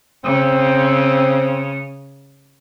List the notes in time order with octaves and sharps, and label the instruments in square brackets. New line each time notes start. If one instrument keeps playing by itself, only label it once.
[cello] C#3 [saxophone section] C4